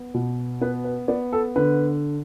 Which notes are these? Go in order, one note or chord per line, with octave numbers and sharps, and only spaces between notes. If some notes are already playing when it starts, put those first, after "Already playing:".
Already playing: B3
B2
B3 B4
B4
B3 D5
A4
D3 B4